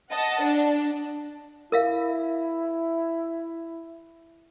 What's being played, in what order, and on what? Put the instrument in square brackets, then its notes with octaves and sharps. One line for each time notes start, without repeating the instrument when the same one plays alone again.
[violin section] D#5 F#5 A5
D4
[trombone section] E4 [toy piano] A#4 E5 F5